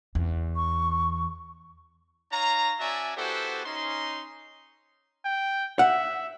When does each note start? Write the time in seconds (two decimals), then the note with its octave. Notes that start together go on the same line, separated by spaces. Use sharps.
0.15 E2
0.56 C#6
2.33 D#4 C#5 F5 A#5
2.80 C#4 F#4 D5 E5 G#5 A5
3.17 B3 E4 F#4 G4 A4 C5
3.66 C#4 D#4 C6
5.25 G5
5.79 E5 F#5